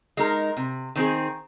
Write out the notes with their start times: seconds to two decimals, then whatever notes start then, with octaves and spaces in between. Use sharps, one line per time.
0.17 G#3 D#4 A#4
0.57 C3
0.96 D#3 C4 G#4